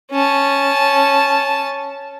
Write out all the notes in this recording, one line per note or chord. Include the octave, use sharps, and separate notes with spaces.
C#4 A5